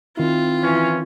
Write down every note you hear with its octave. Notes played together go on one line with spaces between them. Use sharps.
D#3 C4 E4 F4
E3 C#4